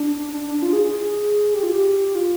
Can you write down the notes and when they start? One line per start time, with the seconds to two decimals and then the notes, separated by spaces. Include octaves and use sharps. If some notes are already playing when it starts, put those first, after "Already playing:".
Already playing: D4
0.33 D4
0.47 D4
0.62 F4
0.73 G#4
0.83 G#4
1.54 G4
1.63 F4
1.72 G4
2.15 F4